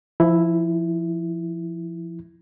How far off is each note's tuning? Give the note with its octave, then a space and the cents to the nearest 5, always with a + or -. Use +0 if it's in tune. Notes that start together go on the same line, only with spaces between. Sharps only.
F3 -25 E4 +0